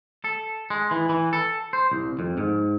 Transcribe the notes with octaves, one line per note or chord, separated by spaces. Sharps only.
A4
G#3
E3
E3
A4
C5
C2
F2
G#2